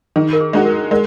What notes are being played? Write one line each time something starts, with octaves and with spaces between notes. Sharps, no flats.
D#3 G#4
A#4
G#4
G#3 D#4 F#4
A#4
G#3 A#4